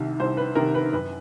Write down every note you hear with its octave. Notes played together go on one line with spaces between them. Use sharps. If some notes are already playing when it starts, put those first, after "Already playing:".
Already playing: C2 C3 D#3
C2 C5
B4
C3 D#3 A#4
B4
F#2 B4